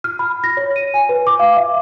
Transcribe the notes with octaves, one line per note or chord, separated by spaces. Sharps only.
F6
B5
A#6
C#5
D#7
G#5
B4
D6
F5
E5